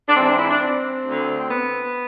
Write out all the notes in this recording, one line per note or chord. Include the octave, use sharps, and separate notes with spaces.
D4
G#2 E3 C4
D4
E4
D4
C4
D2 D3
B3